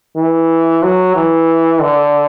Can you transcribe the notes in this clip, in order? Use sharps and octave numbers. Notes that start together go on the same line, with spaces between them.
E3
F#3
E3
D3